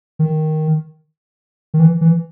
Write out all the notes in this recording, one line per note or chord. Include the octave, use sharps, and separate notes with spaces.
D#3
D#3
E3
E3